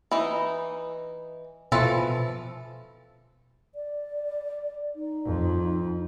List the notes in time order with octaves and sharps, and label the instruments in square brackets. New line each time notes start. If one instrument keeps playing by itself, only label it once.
[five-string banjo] E3 D#4
[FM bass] B2 [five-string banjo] E3 F3 A4
[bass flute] D5
D#4
[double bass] F2